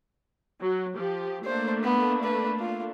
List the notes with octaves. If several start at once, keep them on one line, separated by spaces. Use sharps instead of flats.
F#3
F3 G4
A3 A#3 D4 C5
B3
B4
F4